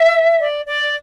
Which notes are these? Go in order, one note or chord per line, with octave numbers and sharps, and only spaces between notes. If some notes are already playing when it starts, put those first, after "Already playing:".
Already playing: E5
D5
D5